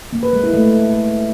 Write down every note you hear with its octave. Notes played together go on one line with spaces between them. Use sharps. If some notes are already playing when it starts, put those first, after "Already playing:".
A#3
B4
G#3
E4
A3